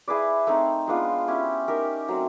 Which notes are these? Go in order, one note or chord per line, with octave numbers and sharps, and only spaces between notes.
E4 G#4 B4 D5
A3 C4 D#4
G#3 B3 D4 F4
C#4 E4 G4
D#4 G4 A#4
F#3 A3 C4